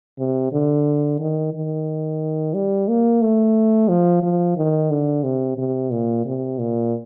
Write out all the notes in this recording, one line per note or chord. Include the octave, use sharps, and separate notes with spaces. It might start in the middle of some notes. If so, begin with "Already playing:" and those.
C3
D3
D#3
D#3
G3
A#3
A3
F3
F3
D#3
D3
C3
C3
A#2
C3
A#2